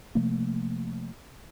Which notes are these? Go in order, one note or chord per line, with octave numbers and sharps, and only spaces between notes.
C3 F3 A3 A#3